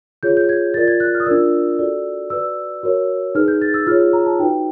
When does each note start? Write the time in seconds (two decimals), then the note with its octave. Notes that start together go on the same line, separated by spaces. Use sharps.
0.23 F4 G#4 C#5 G6
0.37 G6
0.49 G#6
0.74 F4 A#4 D5 A6
0.88 G#6
1.00 F#6
1.14 F6
1.20 D#6
1.26 D4 F4 A#4 D5 E6
1.79 F#4 A4 D5
2.30 F#4 B4 D5 E6
2.83 F#4 A#4 C#5
3.35 D#4 G#4 B4 F6
3.48 G6
3.62 A6
3.74 E6
3.86 F4 G#4 C#5 F6
4.00 E6
4.13 A#5
4.26 A5
4.39 D#4 F#4 B4 G5